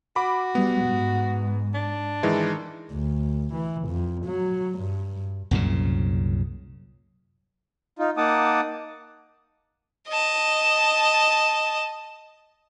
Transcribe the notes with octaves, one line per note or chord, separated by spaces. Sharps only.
F#4 B5 D6
G3 B3
G#2
D4
D#3 E3 G#3
D2
E3
F2
F#3
G2
C2 F#2 A#2 C#3
D#4 F4
A#3 D#4 F#5 A5 D6 D#6
D#5 A5